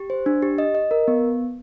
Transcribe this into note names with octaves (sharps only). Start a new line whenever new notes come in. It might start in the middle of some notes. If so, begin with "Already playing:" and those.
Already playing: G4
C5
D4
G4
D#5
D#5
A#4
B3